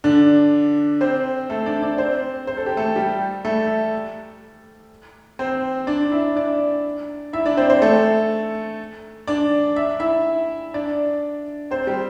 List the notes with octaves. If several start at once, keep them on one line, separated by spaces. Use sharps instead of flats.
D3 D4
C4 C5
A3 A4
D4 D5
D4 D5
C4 C5
C5
A4
G4
A3 A4
G3 G4
A3 A4
C4 C5
D4 D5
E4 E5
D4 D5
E4 E5
D4 D5
C4 C5
C4 C5
A3 A4
D4 D5
E5
E4 E5
D4 D5
C4 C5
G3 G4